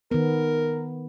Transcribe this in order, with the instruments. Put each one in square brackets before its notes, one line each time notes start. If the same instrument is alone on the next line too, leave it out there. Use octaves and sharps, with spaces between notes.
[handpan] D#3 B3 [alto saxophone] A#4